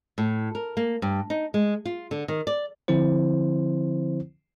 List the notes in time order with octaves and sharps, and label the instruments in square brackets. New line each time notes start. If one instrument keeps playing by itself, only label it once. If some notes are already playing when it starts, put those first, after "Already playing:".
[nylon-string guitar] A2
A#4
A#3
G2
D#4
G#3
F4
D3
D#3
D5
[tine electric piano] D3 F3 C4 E4 C5